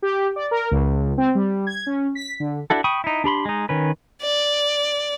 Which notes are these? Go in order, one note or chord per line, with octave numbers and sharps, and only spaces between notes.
G4
D5
A#4
C#2
C4
G3
G#6
C#4
B6
D3
D4 E4 F#4 A4
G5 B5 C#6 D#6
D#4 E4
D4 G4 B5 C6
G#3 D#4
D#3 C#4 B4
D5